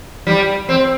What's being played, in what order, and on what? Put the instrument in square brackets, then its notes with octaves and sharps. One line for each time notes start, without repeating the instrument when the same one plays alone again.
[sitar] G3
C4